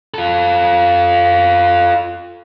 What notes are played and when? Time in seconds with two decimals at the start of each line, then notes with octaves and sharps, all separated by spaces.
0.14 F4 A4